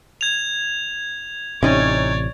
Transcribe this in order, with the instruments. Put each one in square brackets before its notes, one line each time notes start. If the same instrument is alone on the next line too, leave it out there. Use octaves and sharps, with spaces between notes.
[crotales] G#6 F7
[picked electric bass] A1 C3 [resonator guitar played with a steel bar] C#4 D#4 [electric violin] C#5 D5